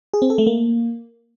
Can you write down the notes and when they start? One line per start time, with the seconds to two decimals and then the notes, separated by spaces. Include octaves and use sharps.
0.14 G#4
0.22 C4
0.30 A4
0.38 A3
0.47 A#3